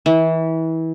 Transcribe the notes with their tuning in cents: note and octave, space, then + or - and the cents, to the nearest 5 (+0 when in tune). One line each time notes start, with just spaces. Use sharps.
E3 -25